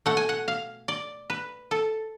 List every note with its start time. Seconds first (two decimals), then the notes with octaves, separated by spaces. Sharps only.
0.06 B2 A3 F#5
0.17 G#5
0.29 F#5
0.48 F5
0.88 D5
1.30 B4
1.71 A4